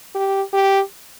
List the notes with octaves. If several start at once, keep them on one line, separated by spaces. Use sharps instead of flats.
G4
G4